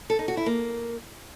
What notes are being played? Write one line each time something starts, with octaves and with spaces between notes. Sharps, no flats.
A4
D#4
F#4
E4
A#3